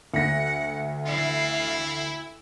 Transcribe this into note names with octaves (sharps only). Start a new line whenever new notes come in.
D2 F#5 A#6
E3 E4 F5